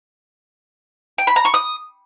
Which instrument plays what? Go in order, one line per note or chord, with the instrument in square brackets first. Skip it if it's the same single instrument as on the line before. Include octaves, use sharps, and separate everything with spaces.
[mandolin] G5
B5
A#5
C#6
D#6